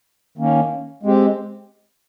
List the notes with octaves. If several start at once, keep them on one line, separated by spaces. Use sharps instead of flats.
D#3 A#3 C#4
G#3 C4 G4